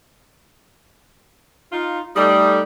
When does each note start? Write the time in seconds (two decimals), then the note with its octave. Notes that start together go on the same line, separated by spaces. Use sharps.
1.72 D#4 F4
2.16 G3 A3 D#4 D#6